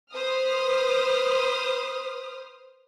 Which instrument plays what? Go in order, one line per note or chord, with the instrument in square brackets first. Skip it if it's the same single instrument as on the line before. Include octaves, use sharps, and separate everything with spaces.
[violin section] B4 C5 D#6 F6